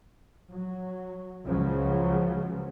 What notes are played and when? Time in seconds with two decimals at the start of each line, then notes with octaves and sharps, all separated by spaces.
0.50 F#3
1.46 C#2 C#3 F3 F#3